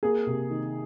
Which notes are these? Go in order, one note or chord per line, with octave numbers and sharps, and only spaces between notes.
A#3 G#4
C3
D#3